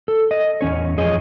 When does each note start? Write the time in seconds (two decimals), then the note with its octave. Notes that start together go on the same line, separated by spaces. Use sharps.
0.08 A4
0.31 D#5
0.61 E2 C#4 C#5
0.98 F2 G#4 C#5 D#5